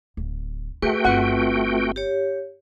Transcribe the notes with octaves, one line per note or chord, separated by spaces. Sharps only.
D1
A3 F4 F#4 G#4 B4 G5
G1 C4 F4 B4 F#5
G4 C#5